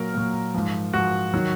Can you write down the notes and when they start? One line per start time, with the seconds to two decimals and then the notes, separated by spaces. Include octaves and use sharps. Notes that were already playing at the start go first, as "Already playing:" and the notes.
Already playing: A#2 F#3 A#4
0.14 A#2 F#3
0.54 G#2 F3
0.93 G#2 F3 F#4
1.34 D#3 F#3